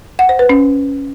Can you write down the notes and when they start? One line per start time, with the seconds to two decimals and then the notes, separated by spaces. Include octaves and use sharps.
0.19 F#5
0.29 C5
0.39 B4
0.49 C#4